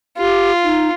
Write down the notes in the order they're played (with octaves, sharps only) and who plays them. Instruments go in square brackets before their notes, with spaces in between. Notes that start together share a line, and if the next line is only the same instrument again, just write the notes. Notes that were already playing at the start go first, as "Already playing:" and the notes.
[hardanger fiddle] F4 [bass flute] G4
[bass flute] D#4